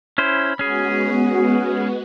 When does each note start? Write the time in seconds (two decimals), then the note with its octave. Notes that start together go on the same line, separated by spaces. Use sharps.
0.18 C#4 E4 C5 B5
0.59 G#3 B3 C#4 F#4 G#4